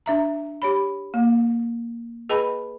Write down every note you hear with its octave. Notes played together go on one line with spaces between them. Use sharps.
D4 E5 A#5
G4 C#5 B5
A#3
G#4 B4 D#5 G5 A5 B5